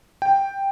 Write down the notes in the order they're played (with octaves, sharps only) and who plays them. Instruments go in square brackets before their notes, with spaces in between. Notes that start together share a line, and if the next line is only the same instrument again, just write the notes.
[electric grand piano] G5